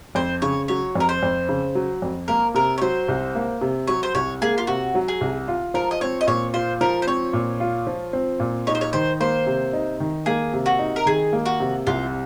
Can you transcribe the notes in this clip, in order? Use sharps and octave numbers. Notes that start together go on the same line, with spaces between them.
F2 C5
C#3 C#5
F#3 C#5
F2 A#4
C5
F2
C#3
F#3
F2
A#3 A#4
C3 A#4
C#5
F#3 C5
C2
A#3
C3
F#3 C#5
C5
C2 C#5
A#3 G#4
F4
C3 F#4
F#3
G#4
C2
F4
F3 A#4
D#5
C4 C#5
D#5
A#2 C#5
F4 C5
F3 A#4
C5
C4 C#5
A#2
F4
F3
C4
A#2
D#4 C#5
C5
C#5
D#3 C5
A#3 C5
C3
D#4
D#3
A#3 G#4
C3
F#4
D#4
A#4
D#3 G#4
A#3
F#4
C3
C2 F4